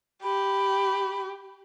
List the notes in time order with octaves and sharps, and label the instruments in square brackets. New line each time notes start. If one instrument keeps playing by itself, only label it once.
[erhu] G4 [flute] B5